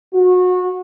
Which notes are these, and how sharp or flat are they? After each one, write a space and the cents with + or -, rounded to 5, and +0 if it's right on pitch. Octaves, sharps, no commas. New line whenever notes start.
F#4 -25